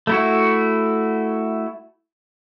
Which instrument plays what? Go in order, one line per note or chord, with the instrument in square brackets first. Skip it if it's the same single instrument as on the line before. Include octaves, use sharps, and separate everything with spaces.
[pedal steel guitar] A3 E4 F#4